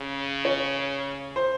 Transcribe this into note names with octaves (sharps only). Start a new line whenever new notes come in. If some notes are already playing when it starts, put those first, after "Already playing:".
Already playing: C#3
C#5
C5